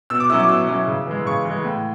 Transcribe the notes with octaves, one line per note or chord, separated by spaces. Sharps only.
B2 E6
D6
F#3 C#4 E4 E6
D6
B2 E6
F#3 C#4 E4
C#3
E3 G#3
C#3 C#6
E3 G#3
A2